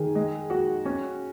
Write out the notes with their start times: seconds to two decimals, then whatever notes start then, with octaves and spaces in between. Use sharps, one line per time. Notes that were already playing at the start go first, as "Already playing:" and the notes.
Already playing: D#3 G#4
0.15 G#3
0.50 F#4
0.85 C#4